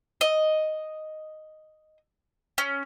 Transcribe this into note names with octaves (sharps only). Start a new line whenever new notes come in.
D#5
C#4